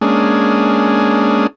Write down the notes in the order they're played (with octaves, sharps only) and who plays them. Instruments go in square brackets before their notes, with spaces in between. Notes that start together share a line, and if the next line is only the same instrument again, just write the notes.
[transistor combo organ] G#3 A#3 C#4 D4 G#4